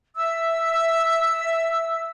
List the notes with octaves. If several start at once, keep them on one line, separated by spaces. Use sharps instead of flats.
E5 E6